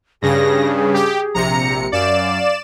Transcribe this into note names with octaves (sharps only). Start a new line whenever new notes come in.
G2 C#3 G#4 A#6
G4
A#1 C3 A#5 C#7
F#2 D5 F5 E7